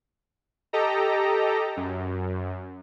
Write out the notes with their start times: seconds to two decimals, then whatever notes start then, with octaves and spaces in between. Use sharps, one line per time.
0.73 G4 A4 D#5 A#5
1.77 F#2